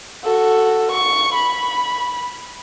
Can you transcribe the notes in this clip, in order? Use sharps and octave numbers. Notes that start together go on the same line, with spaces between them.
F#4 A4
C#6
B5